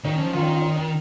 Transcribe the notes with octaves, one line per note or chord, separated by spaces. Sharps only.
D#3 D#4
C#4
F3
D#3 F4
D#4
F4
D#4
D#4